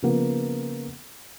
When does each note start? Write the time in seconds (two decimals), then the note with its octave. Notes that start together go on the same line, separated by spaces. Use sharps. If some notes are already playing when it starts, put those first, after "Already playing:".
0.02 C#3 F3 A#3 B3